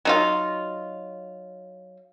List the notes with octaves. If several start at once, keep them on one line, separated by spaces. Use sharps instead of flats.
F#3 D#4 F4